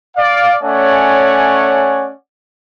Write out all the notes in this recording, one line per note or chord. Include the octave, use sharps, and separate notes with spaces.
D5 F5
A3 C#4 C#5 D5 F#5 G#5